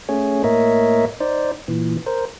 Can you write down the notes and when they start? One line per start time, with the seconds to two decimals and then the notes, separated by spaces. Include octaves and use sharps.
0.09 A3 C#4 G#4 C#5
0.44 A2 A#3 A#4 C#5 D#5 E5
1.20 D#4 C5 D5
1.68 A#2 E3
2.06 A#4 C5